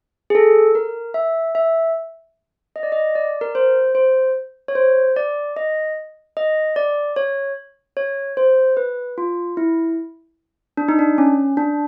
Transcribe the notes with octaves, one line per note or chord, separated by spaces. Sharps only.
G#4
A4
A#4
E5
E5
D#5
D5
D#5
D5
A#4
C5
C5
C#5
C5
D5
D#5
D#5
D5
C#5
C#5
C5
B4
F4
E4
D4
D#4
D4
C#4
D4